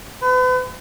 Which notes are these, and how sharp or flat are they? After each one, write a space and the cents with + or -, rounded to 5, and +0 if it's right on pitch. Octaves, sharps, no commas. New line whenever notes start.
B4 +40